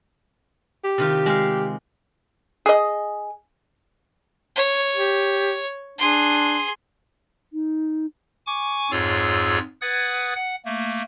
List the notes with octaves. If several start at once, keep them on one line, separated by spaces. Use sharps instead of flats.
G4
C3 D#3 F4
G#3 F5
G#4 D#5
C#5
G4
D4 G#4 C6
D#4
G#5 C#6 D6
F2 G#2 F4 G#4 C#5 E6
B4 F#5 D#6 G#6 A6
F#5
A3 A#3